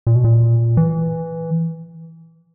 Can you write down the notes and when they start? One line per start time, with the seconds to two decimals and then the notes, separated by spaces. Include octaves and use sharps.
0.07 A#2
0.15 B2
0.24 A#2
0.77 E3